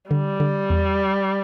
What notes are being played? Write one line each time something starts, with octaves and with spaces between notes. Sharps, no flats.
D3 G3
D3
E2